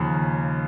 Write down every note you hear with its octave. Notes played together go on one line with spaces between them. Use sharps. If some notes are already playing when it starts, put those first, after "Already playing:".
Already playing: D#2 C#3 F3